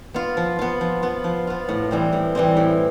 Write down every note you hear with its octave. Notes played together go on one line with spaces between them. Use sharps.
B3 F4
F3
B3 F4
F3
B3 F4
F3
B3 F4
A2
E3 G3 C4
A2
E3 G3 C4
A2